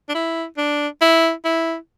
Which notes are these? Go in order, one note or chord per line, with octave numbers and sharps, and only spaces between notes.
D4
E4
D4
E4
E4